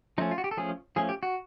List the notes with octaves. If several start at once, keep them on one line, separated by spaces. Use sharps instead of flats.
F3 A3 C#4 D#4
F4
F#4
G4
A4
F3 A3 C#4 G#4
F3 A3 C#4 G#4
G4
F#4